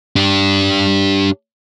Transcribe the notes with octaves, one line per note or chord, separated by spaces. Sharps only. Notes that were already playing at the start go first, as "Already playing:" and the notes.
D4 G4